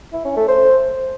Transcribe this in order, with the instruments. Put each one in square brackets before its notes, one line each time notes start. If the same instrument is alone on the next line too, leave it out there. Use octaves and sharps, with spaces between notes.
[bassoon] E4
C#4
A3
C5